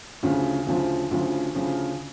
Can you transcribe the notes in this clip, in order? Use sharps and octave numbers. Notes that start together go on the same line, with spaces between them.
D2 C#3 F3
D2 C#3 F3
D2 C#3 F3
D2 C#3 F3